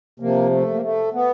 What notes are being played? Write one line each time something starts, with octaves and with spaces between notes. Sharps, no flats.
C3 F3 A#3
A3
A#3
A3
B3